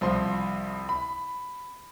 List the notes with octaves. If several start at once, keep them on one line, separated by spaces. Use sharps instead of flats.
C2 F3 C6
B5